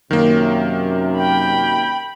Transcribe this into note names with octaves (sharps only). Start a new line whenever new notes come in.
F#2 C3 D#3 A#3
G5 B5